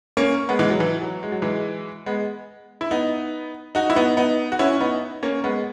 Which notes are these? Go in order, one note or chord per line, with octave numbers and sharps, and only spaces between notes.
A#3 C#4
G#3 B3
E3 G#3
F#3
E3
F#3
G#3
F#3
E3 G#3
G#3 B3
E4
B3 D#4
D#4 F#4
E4
B3 D#4
B3 D#4
F#4
C#4 E4
B3 D#4
A#3 C#4
G#3 B3